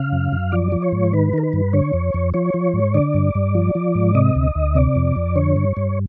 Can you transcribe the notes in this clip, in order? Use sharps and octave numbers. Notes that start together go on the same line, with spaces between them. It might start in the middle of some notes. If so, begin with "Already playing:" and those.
Already playing: C#3 F5
F#2
F#2
F3 D5
F3
C#5
G#2
D#3 B4
D#3 A#4
B4
G2
D3 C#5
F2
F2
F3 C#5
F3
G#2
D3 D5
G2
G2
F3
F3
G#2
C3 D#5
D2
D2
C3 D5
F2
F2
D3 C#5
G2
G2